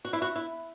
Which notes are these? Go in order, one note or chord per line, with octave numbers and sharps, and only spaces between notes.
F#4
E4
F#4
E4